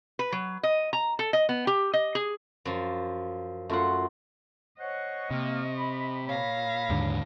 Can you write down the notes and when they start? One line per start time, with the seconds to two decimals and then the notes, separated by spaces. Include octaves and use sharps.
0.19 B4
0.32 F#3
0.63 D#5
0.93 A#5
1.19 A4
1.33 D#5
1.49 B3
1.67 G4
1.93 D#5
2.15 G#4
2.65 F#2 F3
3.69 F#2 A3 F4 F#5 C6
4.79 C5 C#5 D#5 F#5 C#6
5.31 C3 A#3 F6
5.77 B5
6.26 A#2 C#5 F5 B5 A#6
6.89 D#2 G#2 D3